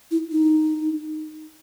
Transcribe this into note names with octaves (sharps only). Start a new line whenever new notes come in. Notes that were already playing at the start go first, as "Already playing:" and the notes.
E4
D#4